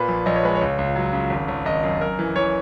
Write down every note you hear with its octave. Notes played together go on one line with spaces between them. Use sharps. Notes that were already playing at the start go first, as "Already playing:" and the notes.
Already playing: A#2 B4
A#1
A#1 D#5
C#5
G#3 B4
C#5
C#2
C#2
F#3
C#3
G#1
G#1
G#1 D#5
F#2
F#2 A#4
E3
E3 C#5